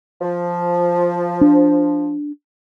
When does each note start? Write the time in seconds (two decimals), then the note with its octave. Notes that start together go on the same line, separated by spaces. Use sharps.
0.21 F3
1.41 D4